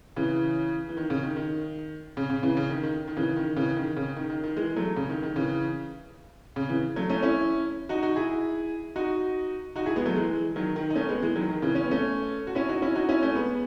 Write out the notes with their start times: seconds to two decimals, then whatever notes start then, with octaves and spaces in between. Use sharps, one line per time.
0.16 C#3 E3
0.89 E3
0.97 D#3
1.10 C#3
1.23 D#3
1.36 D#3
2.17 C#3
2.30 C#3
2.43 C#3 E3
2.57 C#3
2.70 D#3
2.83 D#3
3.07 D#3
3.17 C#3 E3
3.36 D#3
3.56 C#3 E3
3.76 D#3
3.97 C#3
4.16 D#3
4.30 D#3
4.43 D#3
4.56 E3 G#3
4.76 F#3 A3
4.96 C#3
5.09 D#3
5.23 D#3
5.36 C#3 E3
6.56 C#3
6.69 C#3 E3
6.96 F#3 A3
7.09 A3 C#4
7.23 C#4 E4
7.89 D#4 F#4
8.03 D#4 F#4
8.16 E4 G#4
8.96 D#4 F#4
9.76 D#4 F#4
9.86 E4 G#4
9.96 G#3 B3
10.06 F#3 A3
10.16 E3 G#3
10.56 D#3 F#3
10.76 D#3
10.90 D#4
10.95 A3 C#4
11.09 G#3 B3
11.22 E3 G#3
11.36 D#3 F#3
11.49 D#3
11.62 C#3 E3
11.75 C#4
11.84 B3
11.91 A3 C#4
12.47 F#4
12.55 C#4 E4
12.69 D#4 F#4
12.82 C#4 E4
12.95 D#4 F#4
13.09 C#4 E4
13.22 A3 C#4
13.35 G#3 B3